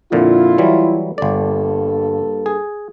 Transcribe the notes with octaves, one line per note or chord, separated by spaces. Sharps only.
F2 A#2 D3 E4 F4
E3 F#3 G3
G1 G2 A#3 A4 D5
G#4